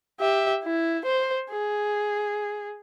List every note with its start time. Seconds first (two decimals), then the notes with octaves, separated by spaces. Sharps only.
0.20 G4 E5
0.64 E4
1.05 C5
1.50 G#4